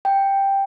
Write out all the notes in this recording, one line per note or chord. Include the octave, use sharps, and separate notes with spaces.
G5